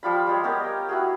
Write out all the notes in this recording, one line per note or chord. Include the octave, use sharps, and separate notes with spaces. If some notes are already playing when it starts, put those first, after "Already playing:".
F3 G3 F4 B5
G3 G#3 C#5
B3 C#4 G4 A#4
D#5 G5
E4 F#4 G#4